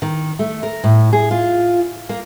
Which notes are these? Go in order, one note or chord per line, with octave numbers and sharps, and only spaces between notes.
D#3
A3
A#4
A2
G#4
F4
A#3